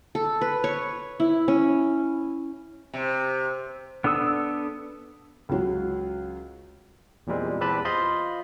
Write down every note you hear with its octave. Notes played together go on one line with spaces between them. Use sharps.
A4
B4
C#5
E4
C#4
C3
B3 D4 A4 D#6 E6
C#2 F#3
E2 A#2 G3 G#3 C4
E2 C4 G4 B4 A5 B5
F4 C5 D#5 F5 B5 C6